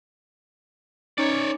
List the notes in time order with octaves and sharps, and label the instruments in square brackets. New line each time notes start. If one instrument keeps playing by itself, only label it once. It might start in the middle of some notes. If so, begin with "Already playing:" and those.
[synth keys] C#4 D#4 [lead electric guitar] C#5 D5